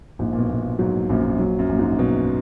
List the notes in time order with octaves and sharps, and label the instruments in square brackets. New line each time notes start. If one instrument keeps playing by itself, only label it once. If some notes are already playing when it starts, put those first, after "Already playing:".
[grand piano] A#1 [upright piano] G#2
[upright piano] A#2
B2
[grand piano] A#1
[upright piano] G#2 [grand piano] F#3
[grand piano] A#1 [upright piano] F#2
[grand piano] F#3
[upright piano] F#2
[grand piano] A#1
[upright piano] G#2
[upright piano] B2 [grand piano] F#3